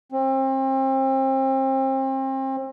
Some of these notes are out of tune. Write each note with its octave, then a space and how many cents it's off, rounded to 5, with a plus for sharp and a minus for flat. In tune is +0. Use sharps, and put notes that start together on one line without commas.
C4 +35